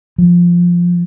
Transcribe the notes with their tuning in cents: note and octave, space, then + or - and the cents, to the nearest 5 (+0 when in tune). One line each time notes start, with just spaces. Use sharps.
F3 +0